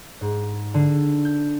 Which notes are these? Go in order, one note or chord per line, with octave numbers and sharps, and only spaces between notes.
G#2
D3
G6